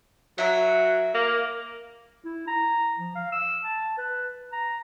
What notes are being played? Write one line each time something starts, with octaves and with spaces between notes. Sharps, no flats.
F#3 A#4 E5
A#3
E4
A#5
F3
F5
E6
A5
B4
A#5